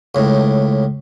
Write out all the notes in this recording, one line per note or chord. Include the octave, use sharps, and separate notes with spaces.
C#2 A2